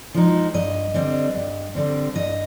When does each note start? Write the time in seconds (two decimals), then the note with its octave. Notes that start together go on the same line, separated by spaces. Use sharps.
0.14 F3 G#3 D#4
0.54 G2 D#5
0.94 D3 G3 C4
1.35 G2
1.75 D3 G3 C4
2.15 G2 D#5